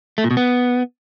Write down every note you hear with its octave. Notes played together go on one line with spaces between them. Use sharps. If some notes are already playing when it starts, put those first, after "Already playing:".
A3
A#2
B2
B3